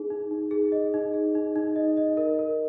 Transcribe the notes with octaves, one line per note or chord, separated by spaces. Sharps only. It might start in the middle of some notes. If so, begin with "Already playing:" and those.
Already playing: D#4 G#4
D#4
D#4
G#4
D#5
D#4
G#4
D#4
D#4
D#5
D#5
A#4
A#4